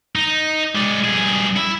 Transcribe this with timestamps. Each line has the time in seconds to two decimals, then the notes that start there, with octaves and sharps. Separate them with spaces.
0.16 D#4
0.76 G#3 D5
1.05 G2 G#4
1.57 E4